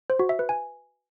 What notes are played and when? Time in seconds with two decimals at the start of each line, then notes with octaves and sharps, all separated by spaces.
0.10 C5
0.19 F#4
0.29 E5
0.39 B4
0.49 G#5